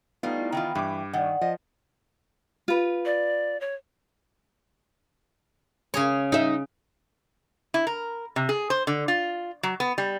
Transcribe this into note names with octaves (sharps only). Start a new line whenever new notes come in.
G3 A3 B3 D#4 F4
E4
D#3 E3 F4 G5
G2 E3 D6
D#3 D5 F#5
F3 D#5
F4 B4
D5
C#5
C#3 G#4 C#5
D#4 E5
E4
A#4
C3
G#4
C5
D3
F4
F#3
B3
G3